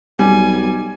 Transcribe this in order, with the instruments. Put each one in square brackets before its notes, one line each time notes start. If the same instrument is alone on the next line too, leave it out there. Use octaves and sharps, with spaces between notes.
[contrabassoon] B1 [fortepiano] G3 [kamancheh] G#5